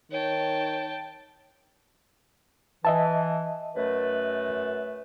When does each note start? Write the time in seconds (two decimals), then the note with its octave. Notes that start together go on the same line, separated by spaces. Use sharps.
0.11 D#3 C#5 G5 A5
2.85 E3 D#5 E5 A5
3.76 F#2 A3 B4